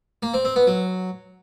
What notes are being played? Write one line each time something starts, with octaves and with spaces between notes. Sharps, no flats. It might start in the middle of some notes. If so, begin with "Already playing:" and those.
A#3
C4
C4
B3
F#3